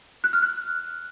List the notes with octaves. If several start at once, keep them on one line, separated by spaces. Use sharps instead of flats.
F#6
F6
F#6